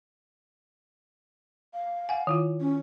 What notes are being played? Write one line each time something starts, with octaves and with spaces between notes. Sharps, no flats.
F5
F#5 G#5
D#3 E4 F4
C#4